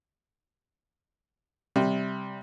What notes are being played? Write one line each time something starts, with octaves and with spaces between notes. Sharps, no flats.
C3 G3